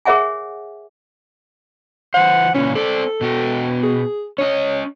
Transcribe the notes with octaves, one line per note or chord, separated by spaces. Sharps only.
G#4 A#4 C#5 E5 F#5 G#5
E3 C5 F#5
A#2 C#3 E3 C#4
C4 A4 D5
B2 F#4 G5
G#4
C#4 C#5 D#5